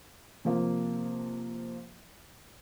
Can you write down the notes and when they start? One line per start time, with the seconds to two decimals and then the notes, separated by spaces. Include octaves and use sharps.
0.45 C3 F3 A#3